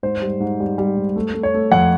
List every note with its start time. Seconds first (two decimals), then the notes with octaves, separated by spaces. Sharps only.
0.03 G#2 C5
0.21 G3
0.40 G#2
0.60 G3
0.78 G3
0.96 G#2
1.16 A3
1.34 A3
1.43 C#5
1.54 A3
1.72 F2 F#5